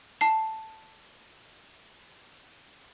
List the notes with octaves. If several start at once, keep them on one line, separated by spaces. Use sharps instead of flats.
A5 C7